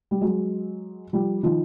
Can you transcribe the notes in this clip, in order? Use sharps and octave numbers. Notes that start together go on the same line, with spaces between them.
G3
F#3 G#3
F3 G3
D#3 F3